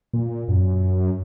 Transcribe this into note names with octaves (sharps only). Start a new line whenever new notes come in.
A#2
F#2